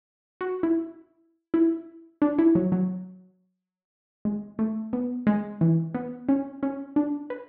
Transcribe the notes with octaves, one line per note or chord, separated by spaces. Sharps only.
F#4
E4
E4
D4
E4
F#3
F#3
G#3
A3
B3
G#3
E3
B3
C#4
C#4
D4
B4